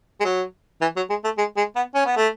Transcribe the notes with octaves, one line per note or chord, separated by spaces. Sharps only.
G#3
F#3
E3
F#3
G#3
A3
G#3
G#3
B3
C#4
B3
A3